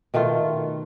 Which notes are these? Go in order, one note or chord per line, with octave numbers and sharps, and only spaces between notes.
B2 D#3 A3 F4